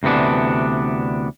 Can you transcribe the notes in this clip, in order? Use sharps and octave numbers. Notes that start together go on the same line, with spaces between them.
D2 C3 E3 B3 D4